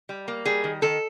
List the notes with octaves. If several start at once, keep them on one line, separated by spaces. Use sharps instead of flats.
G3
A#3
G3 G#4
D#3
D#3 A4